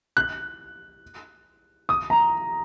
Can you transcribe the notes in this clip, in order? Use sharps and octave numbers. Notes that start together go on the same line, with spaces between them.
F#6
D#6
A#5